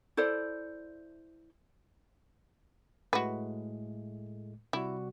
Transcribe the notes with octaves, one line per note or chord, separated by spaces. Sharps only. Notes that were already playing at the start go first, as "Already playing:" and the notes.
E4 A4 C5 D5
A2 G#3 A3 F#4 B4
C3 G3 E4 F#4